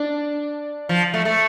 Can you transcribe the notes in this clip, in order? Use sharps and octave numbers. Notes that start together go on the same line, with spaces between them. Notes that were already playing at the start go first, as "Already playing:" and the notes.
Already playing: D4
F3
A3
A3